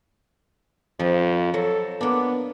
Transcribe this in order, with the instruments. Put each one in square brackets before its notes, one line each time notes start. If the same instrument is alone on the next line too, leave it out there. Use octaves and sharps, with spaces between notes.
[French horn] F2 [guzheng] F3
[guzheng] F#3 [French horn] A4
[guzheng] A#3 D4 [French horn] B3